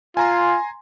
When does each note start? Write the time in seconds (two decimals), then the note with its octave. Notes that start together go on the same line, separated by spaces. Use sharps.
0.17 F4 G#5 A#5 C6